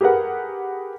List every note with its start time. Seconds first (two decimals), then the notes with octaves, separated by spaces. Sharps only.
0.01 G4 G#4 A#4 B4 F#5